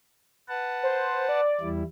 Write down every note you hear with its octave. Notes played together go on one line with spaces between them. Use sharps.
B4 F#5 A5
C5
D5
E2 G3 E4